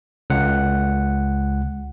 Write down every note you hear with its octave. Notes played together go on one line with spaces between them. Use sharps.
C#2 F#5